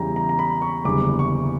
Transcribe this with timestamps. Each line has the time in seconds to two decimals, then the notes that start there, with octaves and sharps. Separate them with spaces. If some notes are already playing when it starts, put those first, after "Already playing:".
Already playing: E2 C#3 E3 G3 G5 A#5
0.16 A#5
0.29 A#5
0.39 B5
0.62 C#6
0.84 F#1 E2 D3 G3 D6
1.19 C#6